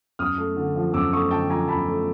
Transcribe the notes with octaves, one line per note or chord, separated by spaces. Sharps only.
F#2 D#6 F6
A3
D3
F3
F#2 D6 E6
A3 C#6 D#6
D3 G5 A5
F3 G#5 A#5
F#2 A5 B5
A3